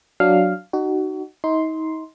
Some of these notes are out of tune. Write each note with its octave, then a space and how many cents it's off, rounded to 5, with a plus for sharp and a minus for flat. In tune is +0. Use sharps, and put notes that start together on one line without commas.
F#3 +0 D4 +0 F5 +0
D#4 -25 F#4 +25
D#4 +35 C6 +0